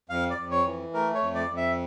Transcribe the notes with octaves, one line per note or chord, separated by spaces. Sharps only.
F2 F5
D5
F2
C#5
E3
A3 A#4
C#5
F2
D5
F2
E5